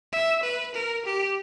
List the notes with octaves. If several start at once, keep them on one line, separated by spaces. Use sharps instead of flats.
E5
B4
A#4
G4